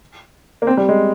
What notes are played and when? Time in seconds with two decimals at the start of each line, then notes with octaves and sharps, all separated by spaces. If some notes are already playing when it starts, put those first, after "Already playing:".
0.62 A#3
0.67 C4
0.77 G3
0.89 G#3